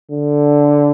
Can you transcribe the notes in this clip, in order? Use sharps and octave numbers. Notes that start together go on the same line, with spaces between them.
D3